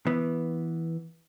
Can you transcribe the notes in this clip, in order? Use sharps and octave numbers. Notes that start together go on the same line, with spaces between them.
E3 B3